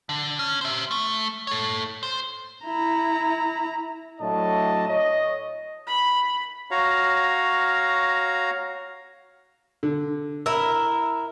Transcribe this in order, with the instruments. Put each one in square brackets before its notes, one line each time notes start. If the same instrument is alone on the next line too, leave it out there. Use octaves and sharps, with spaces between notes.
[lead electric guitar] D3
C#4
C5 E5
A3
A4 C#5
C5
[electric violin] E4 A#5
[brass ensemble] A2 F#3 D4 D#5 A5
C#5 D#5
[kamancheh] B5
[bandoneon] F#4 C#5 F5 A#5
[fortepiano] D3
[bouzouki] E4 A#4 [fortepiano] E6